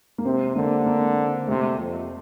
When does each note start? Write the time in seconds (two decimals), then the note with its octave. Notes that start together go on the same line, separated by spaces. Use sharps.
0.18 A#3
0.25 C3 C4
0.56 D3 A#3
0.86 A#3
1.48 C3 A3
1.78 F2